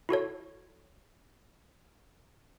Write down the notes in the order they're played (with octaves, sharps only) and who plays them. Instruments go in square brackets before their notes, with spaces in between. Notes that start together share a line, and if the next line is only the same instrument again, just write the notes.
[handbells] E4 F#4 A4 C#5